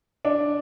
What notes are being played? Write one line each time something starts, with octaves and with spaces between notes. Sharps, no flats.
D4